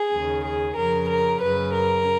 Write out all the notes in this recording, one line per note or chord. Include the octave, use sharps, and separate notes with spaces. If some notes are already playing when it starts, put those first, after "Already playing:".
Already playing: G#4
D#2 C#3
G#4
F2 C#3 A#4
A#4
F#2 C#3 B4
A#4